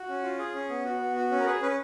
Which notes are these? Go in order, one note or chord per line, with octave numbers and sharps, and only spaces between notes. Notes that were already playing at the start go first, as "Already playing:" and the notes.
Already playing: F#4
C#4
F4
G#4
C#4
B3
F#4
B3
F#4
C#4
A#4
G#4 B4
C#4 B4